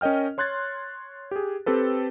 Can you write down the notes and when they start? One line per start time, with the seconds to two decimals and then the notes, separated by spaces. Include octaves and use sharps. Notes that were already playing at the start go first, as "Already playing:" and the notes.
0.01 C#4 A#4 D#5 G5 F6
0.38 C#5 C6 F#6 G#6 A6
1.31 G4 G#4
1.66 C4 G4 A4 B4